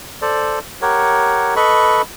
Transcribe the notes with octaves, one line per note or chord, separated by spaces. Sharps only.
A4 C5 D5
G4 A#4 C#5 F#5
A4 B4 D#5 B5 C#6